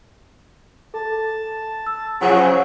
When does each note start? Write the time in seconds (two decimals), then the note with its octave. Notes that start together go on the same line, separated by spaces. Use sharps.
0.94 A4 A5
1.86 E6
2.21 C#3 F3 F#3 F#5